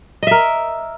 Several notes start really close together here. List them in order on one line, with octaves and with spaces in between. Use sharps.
D#5 E5 A#4